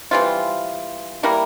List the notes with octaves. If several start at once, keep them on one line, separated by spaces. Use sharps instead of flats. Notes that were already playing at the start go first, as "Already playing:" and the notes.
E3 G3 C4 F4
G3 A#3 E4 A#4